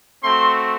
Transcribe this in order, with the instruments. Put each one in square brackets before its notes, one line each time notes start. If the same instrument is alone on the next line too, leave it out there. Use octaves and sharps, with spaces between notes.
[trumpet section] A3 C4 F#4 C6